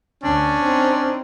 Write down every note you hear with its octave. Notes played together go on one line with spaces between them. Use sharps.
D2 C#4 D4
C4 D#4